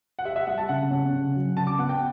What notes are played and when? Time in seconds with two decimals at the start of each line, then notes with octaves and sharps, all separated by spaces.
0.19 F#5
0.25 G4 E5
0.36 E5
0.47 G3 F#5
0.58 A5
0.69 C#3 F#5
0.91 C#4
1.13 C#3
1.35 F#3
1.56 C#3 A5
1.67 D6
1.79 B3 F#5
1.89 G5